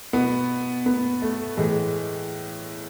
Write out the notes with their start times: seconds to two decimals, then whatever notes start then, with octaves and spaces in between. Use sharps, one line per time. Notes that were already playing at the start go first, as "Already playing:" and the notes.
0.13 B2 B3
0.86 B3
1.22 A3
1.57 A2 E3 G#3